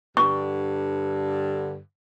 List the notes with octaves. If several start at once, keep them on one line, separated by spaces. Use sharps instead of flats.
G2 D3 C#6